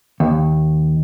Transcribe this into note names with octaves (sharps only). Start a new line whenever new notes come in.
D#2